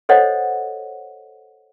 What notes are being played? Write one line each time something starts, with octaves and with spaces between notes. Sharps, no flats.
A4 C5 C#5 D#5 F#5